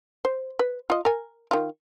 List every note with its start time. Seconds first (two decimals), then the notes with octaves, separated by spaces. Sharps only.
0.25 C5
0.59 B4
0.90 F4 D#5
1.05 A#4 G#5
1.51 D#3 F4